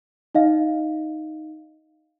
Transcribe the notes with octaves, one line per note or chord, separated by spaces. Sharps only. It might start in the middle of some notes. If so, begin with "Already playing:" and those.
D#4 D#5 F5